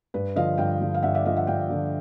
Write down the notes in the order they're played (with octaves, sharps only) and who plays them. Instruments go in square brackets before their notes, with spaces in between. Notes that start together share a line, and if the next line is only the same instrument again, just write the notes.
[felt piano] G2 B4
D3 F3 D#5 F5
G2 F5 G5
D3 F3
F5
G2 E5 F#5
D5 E5
D3 F3 D#5 F5
E5 F#5
G2 F5 G5
D3 F3